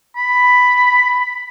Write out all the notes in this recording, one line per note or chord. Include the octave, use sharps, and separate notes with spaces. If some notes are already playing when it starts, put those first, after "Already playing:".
B5